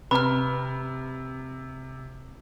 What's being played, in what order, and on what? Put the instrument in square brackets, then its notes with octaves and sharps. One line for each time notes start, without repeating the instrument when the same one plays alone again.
[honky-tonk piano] C3 [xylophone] B4 F6 [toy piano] A#5 B5